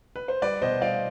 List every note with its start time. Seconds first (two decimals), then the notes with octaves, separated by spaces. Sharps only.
0.16 B4
0.28 C5
0.42 G3 B4 D5
0.62 B2 C5 D#5
0.81 G3 D5 F5